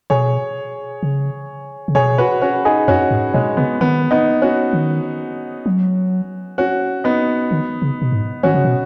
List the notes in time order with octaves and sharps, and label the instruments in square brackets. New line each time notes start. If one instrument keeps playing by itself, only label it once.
[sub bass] B2 [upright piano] G#4 C#5
[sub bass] C#3
C#3
[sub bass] B2 [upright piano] G#4 C#5
[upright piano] F#4 B4
C#4 F#4
D#4 G#4
[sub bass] F#2 [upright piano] C#4 F#4
[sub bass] G#2
[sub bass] B2 [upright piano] G#3 C#4
[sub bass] C#3 [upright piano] B3
[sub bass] D#3 [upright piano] B3
[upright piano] B3 D#4
C#4 F#4
[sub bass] D#3
F#3
[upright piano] C#4 F#4
B3 D#4
[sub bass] D#3
C#3
B2
G#2
[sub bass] D#3 [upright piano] C#4 F#4
[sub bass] C#3
B2